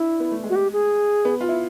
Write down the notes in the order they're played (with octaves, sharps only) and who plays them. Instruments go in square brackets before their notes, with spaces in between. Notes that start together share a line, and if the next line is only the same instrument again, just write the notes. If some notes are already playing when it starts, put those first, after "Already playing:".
Already playing: [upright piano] D4 [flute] E4
[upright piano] B3
A3
G#3
[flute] F#4
G4
G#4
[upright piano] B3
F4
E4